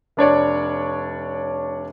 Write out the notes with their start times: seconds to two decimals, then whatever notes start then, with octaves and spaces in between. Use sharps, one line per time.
0.17 F1 D4 C#5 D5